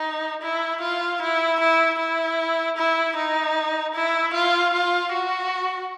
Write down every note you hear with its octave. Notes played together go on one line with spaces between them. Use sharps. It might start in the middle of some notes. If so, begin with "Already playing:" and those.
Already playing: D#4
E4
F4
E4
E4
E4
E4
D#4
E4
F4
F4
F#4